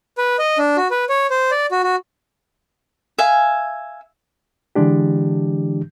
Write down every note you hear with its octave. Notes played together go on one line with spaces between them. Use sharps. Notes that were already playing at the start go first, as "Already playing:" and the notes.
B4
D#5
D4
F#4
B4
C#5
C5
D5
F#4
F#4
E5 F5 G#5
D3 E3 G#3 D4 G4